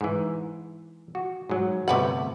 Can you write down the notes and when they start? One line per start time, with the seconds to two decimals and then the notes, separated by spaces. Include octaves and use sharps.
0.01 G#2 E3
1.15 F#4
1.49 G#2 F#3
1.88 G1 C3 A3 B4 F#5